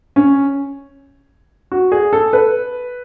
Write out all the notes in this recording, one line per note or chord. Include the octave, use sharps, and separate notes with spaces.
C#4
F#4
G#4
A4
B4